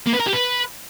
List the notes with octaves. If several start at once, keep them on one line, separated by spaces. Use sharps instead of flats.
A#3
B4
A#4
G4
B4